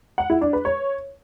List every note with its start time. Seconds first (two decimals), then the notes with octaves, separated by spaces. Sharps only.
0.18 F#5
0.30 E4
0.41 D4
0.53 B4
0.65 C#5